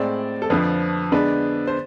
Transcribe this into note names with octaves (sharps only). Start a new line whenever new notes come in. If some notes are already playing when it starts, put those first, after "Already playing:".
Already playing: A2 G#3 C4 D5
A4
F2 D3 F3 B4
D3 G#3 B3 D4 B4
C5